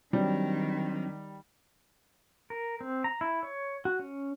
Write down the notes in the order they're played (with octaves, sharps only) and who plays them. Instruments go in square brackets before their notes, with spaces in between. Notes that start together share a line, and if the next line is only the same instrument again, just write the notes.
[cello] D#3 [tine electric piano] F#3 C4 D4 [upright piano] G3
[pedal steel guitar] A#4
C4
A#5
E4
C#5
F#4
C#4